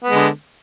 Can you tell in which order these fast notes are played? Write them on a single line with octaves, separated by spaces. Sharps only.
B3 G#3 D3